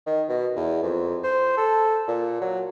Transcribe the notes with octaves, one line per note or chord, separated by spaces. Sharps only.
D#3
B2
E2
F2
C5
A4
A#2
F#3